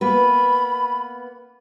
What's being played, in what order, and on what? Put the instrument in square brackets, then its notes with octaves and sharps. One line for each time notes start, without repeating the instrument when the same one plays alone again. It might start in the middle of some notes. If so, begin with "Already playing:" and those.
[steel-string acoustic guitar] A#3 B3 B4 [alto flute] B5